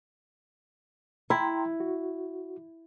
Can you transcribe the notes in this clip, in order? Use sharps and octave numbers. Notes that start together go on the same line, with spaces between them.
E4 G5 A#5 C6
F#4